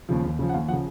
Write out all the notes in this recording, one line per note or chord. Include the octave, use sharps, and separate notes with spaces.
D#2 C#3 F3
D#2
C#3 F3
F#5
D#2 F5
C#3 F3 F#5